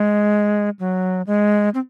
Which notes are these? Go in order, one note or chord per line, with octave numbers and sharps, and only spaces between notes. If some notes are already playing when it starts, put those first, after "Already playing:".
Already playing: G#3
F#3
G#3
C4